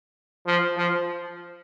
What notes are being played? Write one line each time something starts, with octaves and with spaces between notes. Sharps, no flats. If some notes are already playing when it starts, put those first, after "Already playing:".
F3
F3